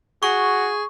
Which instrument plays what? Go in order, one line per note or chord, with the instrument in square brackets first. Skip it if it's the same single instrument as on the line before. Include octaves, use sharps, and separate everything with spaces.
[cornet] F#4 [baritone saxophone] G#4 [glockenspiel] C#6